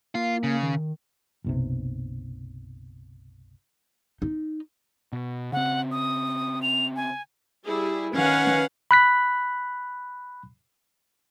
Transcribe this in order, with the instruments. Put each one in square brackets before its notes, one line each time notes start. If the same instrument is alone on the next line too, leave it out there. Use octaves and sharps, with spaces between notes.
[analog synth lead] A#3 [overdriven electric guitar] F4
[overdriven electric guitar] C#3
[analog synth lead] D#3
[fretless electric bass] F#1 B1 C3
[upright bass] D#4
[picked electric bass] B2
[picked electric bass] C#3 C4 [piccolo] F#5
[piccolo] D#6
F7
G#5
[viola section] G3 E4 G#4
[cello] D#3 C#4 [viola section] B4 F5 F#5
[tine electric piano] B5 F#6 B6